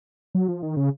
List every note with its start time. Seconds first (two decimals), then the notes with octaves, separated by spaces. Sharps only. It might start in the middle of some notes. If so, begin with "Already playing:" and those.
0.35 F#3
0.48 F3
0.62 D#3
0.77 C#3